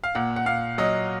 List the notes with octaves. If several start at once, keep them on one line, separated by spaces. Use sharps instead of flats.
F5
A#2 F#5
F#5
A#2 F5
F#3 D#5